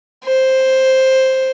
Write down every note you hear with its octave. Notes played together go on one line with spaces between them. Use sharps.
C5